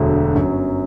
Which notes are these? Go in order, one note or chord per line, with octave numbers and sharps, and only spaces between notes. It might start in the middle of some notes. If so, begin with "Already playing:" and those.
Already playing: E1 D2 D3 F#3
G1 F#2 F#3